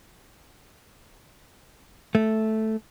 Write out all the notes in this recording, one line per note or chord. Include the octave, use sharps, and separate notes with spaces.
A3